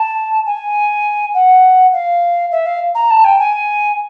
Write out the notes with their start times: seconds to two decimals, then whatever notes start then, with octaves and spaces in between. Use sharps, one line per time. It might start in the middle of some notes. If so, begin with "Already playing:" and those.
Already playing: A5
0.46 G#5
1.34 F#5
1.93 F5
2.51 E5
2.66 F5
2.95 A#5
3.10 A5
3.24 G5
3.39 G#5